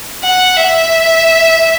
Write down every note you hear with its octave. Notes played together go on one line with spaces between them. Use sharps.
F#5
E5